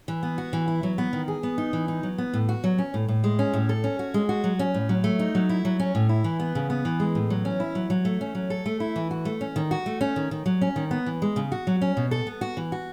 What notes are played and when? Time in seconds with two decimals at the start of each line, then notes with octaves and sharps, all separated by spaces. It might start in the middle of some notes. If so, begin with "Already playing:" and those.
0.08 E3
0.23 B3
0.38 F#4
0.53 E3
0.68 E4
0.83 F#3
0.98 B3
1.13 D#3
1.28 G#4
1.43 B3
1.58 D#4
1.73 E3
1.88 D#4
2.03 F#3
2.18 B3
2.34 A2
2.49 F#4
2.64 F#3
2.78 C#4
2.94 A2
3.08 A2
3.24 G#3
3.39 C#4
3.53 A2
3.69 A4
3.84 C#4
3.99 F#4
4.14 G#3
4.29 F#4
4.44 F#3
4.59 C#4
4.74 A2
4.89 F#3
5.04 A3
5.19 D#4
5.35 F#3
5.49 E4
5.65 F#3
5.80 C#4
5.95 A2
6.09 E4
6.24 E3
6.40 B3
6.55 C#3
6.70 B3
6.85 E3
7.00 G#3
7.15 A2
7.30 F#3
7.45 C#4
7.60 E4
7.75 F#3
7.90 F#3
8.05 A3
8.21 C#4
8.35 F#3
8.50 A4
8.66 A3
8.80 E4
8.96 E3
9.11 F#4
9.25 A3
9.41 C#4
9.56 D#3
9.71 F#4
9.86 A3
10.01 C#4
10.16 D#3
10.31 D#3
10.46 F#3
10.61 C#4
10.76 D#3
10.91 B3
11.06 E3
11.22 G#3
11.36 C#3
11.52 F#4
11.67 F#3
11.81 C#4
11.97 B2
12.11 A4
12.27 B3
12.41 F#4
12.57 E3
12.72 F#4